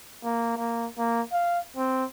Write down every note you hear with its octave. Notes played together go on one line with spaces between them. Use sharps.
A#3
A#3
A#3
F5
C4